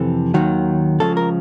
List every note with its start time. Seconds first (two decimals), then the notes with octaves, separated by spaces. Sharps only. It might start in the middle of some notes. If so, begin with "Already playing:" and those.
Already playing: F2 C3 E3 A4
0.34 D#2 D#3 F#3
1.00 C#2 C#3 F3 A4
1.17 A#4